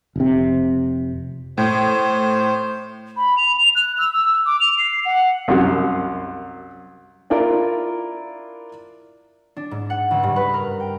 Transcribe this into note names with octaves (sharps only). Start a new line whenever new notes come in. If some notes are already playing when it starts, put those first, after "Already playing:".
F1 C3
A2 C5
B5
F7
F7
F#6
E6
E6
D6
F7
C7
F#5
C2 F#2
D4 E4 F4 A#4 D5
D4
G#2
F#5
C#2
G2
B4
A#4
G5